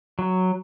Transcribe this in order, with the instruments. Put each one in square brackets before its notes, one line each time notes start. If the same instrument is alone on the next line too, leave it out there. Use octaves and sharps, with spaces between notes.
[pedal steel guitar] F#3